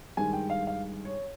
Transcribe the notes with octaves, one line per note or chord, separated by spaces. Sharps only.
G2 D#3 G#3 G#5
G5
F5
F5
C#5